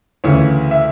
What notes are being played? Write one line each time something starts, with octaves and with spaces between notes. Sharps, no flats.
D2 C#3 E3 C#5
E5